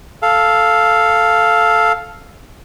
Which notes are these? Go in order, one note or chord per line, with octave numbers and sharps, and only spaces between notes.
A4 F5